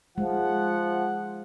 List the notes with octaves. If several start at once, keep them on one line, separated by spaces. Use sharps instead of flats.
F3 G#3 F#5